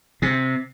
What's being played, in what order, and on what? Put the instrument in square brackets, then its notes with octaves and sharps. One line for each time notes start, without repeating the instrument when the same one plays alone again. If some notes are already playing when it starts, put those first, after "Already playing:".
[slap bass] C3